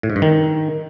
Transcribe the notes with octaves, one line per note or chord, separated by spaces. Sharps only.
A2
G#2
G2
D#3